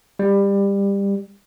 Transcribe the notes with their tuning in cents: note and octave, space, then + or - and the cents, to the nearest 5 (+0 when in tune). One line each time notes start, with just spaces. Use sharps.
G3 +20